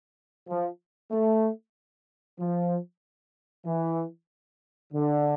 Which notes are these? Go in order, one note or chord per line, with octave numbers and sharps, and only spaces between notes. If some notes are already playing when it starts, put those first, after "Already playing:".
F3
A3
F3
E3
D3